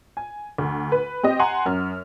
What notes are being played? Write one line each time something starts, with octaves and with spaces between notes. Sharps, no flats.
G#5
D2
B4
C4 G4 D#5
F#5 G#5 A#5 C6
F#2 F6